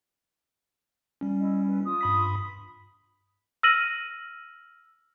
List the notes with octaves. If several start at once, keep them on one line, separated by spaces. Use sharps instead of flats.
G3 C#4
E4 D#5
B4
F4 D#6
G2 B5 B6
E6 F6 A#6 D#7 F#7